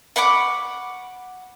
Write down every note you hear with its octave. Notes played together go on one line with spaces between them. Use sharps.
F#5 B5 C#6 D6